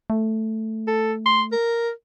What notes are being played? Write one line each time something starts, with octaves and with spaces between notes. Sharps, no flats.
A3
A4
C6
A#4